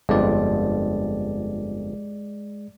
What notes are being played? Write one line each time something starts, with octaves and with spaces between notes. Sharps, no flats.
G1 F2 G#3 D5